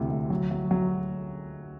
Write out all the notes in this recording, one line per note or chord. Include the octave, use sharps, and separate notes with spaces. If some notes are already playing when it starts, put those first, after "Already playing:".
Already playing: D2 C3 E3
D2
F#3
F#3
F#3